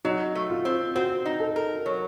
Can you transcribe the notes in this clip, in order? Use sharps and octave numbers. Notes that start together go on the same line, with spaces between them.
F#3 D#4
A3
F4
C4
C4 F#4
D#4
A4
A#4
F#3